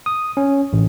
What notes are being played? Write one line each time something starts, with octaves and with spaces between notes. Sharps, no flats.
D#6
C#4
A1